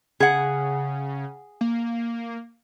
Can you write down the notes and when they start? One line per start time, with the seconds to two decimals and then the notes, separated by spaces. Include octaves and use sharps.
0.20 C#3 G#4 F#5
1.61 A#3